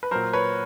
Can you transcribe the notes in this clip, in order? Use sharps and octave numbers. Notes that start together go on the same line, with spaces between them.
B4
A#2 F#3 A#4 C5
B4 C#5